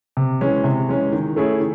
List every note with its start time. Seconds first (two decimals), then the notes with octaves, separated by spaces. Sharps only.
0.17 C3
0.41 E3 G#3 C#4
0.64 C3
0.88 E3 G#3 C#4
1.12 D#3
1.36 A3 C#4 E4 G#4
1.60 D#3